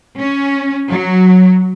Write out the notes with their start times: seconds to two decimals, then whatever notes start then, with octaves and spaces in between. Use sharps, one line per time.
0.17 C#4
0.90 F#3